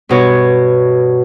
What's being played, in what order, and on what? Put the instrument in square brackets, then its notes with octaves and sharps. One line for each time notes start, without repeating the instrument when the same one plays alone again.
[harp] G2 B2 C#5